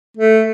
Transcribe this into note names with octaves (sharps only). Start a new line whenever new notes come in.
A3